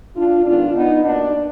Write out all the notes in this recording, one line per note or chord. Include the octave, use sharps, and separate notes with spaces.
D4 F4
D#3 G#3 B3 D4 F4
B3 D#4
B2 A#3 D4